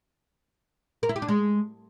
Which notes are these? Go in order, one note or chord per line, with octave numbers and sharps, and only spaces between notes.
A#4
E4
G4
D4
G#3